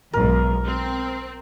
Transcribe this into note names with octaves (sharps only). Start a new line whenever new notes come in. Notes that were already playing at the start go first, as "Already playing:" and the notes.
B1 G#2 A#4
C4